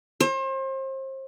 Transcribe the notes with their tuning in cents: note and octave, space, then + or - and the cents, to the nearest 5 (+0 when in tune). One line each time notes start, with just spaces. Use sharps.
C5 +35